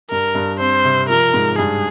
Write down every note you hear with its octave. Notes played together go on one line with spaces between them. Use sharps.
G2 A#4
G2
C4 C5
C3
F3 A#4
G#2
G2 G#4